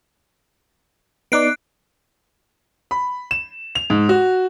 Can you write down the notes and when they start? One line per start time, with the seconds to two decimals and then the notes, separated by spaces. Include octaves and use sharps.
1.32 B3 D#4 D5 F#6 C7 D7
2.91 B5
3.31 E7
3.75 F7
3.90 G#2
4.09 F#4